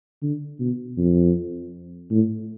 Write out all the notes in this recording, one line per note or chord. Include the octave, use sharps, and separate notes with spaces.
D3
B2
F2
A2